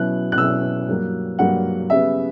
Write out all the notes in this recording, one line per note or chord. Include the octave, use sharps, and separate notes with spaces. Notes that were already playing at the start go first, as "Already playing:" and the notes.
Already playing: B2 F#3 C#4 E4 F#6
F#6
B2 F#3 C#4 E4 E6
G2 F#3 A#3
G2 F#3 A#3 F#5
C#3 G3 B3 E5